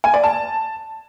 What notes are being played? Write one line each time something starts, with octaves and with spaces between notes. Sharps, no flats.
G#5
D5
A5